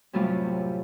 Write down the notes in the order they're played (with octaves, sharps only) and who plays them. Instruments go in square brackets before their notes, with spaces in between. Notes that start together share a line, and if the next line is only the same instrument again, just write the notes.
[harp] F#2 A2 C3 G3 C#4 F4